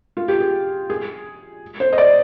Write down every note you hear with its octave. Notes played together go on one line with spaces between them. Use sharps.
F4
G4
G#4
G#4
C5
D#5
D5